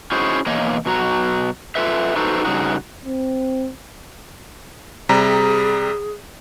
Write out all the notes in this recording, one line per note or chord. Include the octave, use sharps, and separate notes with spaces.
C#4 D#4 E4 F#4 G#4 C5
B2 E3 A#3 C#5 D#5
B2 F#3 F#4 A#5
F4 A4 B4 E5
D#4 F#4 A4 B4 C5
G2 A#2 C#3 D#4 F#4
C4
C3 G3 G#4 A#5